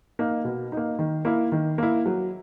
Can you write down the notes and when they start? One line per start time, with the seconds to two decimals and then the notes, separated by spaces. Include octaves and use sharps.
0.19 A#3 D#4
0.45 B2
0.72 A#3 D#4
0.99 D#3
1.25 A#3 E4
1.52 D#3
1.78 A#3 E4
2.06 F#3